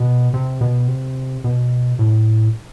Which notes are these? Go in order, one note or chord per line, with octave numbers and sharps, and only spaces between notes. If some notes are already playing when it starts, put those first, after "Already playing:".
Already playing: B2
C3
B2
C3
B2
A2